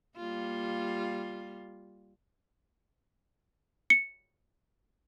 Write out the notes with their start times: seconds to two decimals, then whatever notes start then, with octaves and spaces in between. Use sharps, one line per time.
0.16 G3 A#3 F4
3.90 C#7